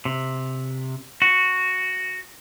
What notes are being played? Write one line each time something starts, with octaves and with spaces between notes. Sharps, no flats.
C3
F#4